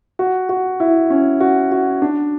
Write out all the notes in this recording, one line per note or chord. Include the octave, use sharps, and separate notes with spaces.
F#4
F#4
E4
C#4
F#4
F#4
D4